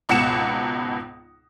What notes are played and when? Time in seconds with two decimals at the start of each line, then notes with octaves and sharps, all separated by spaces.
0.09 G#1 C#2 B2 F#5 C#7 E7